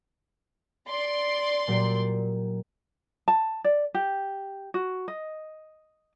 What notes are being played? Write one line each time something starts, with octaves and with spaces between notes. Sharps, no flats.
D5 C6
A#2 F#3 G4
A5
D5
G4
F#4
D#5